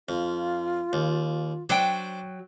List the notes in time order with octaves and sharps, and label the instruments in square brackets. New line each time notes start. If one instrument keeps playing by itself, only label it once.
[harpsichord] F2 [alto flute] F4
[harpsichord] D#2
[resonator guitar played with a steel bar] F#3 G5 [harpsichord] D4 C5 D6